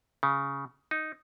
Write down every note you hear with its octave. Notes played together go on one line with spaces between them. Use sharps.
C#3
D#4